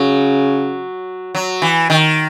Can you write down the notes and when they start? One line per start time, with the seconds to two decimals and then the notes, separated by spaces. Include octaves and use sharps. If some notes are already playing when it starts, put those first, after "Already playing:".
Already playing: C#3 F#3
1.35 F#3
1.62 E3
1.90 D#3